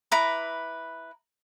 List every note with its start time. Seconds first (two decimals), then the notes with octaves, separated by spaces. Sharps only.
0.12 E4 B4 A#5 D6